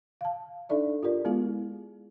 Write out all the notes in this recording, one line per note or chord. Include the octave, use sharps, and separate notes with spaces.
F5 A5
D4 D#4 A4 D5 E5
F4 G4 A#4 D5
G#3 B3 E4 F4 G#4